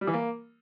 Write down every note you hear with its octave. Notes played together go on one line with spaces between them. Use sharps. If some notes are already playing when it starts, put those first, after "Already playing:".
G3
E3
A#3